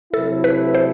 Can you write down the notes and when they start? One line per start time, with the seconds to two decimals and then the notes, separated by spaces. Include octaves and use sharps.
0.13 C3 F#3 A3 E4 A4
0.44 B4
0.75 C5